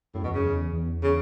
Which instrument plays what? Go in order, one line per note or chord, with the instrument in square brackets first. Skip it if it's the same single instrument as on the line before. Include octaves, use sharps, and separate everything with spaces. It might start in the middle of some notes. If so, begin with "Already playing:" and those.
[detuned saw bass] F#2 [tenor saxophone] A2
[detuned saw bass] E2 [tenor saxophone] B2
[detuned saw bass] F#2 [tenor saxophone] C#3
[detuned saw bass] E2
E2
[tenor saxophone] C#3